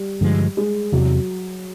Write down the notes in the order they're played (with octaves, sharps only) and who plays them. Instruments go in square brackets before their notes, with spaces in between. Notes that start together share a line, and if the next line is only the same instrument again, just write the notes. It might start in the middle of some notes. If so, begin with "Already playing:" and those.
Already playing: [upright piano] G3
[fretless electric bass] G2 D3 F3 G#3
[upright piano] G#3
[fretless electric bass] E2 C3 E3 [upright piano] F#3